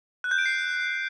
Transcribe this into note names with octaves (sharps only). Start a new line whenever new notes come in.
F#6
G6
D7
C7